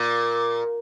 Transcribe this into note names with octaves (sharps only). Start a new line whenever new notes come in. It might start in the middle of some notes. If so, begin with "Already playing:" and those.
Already playing: A#2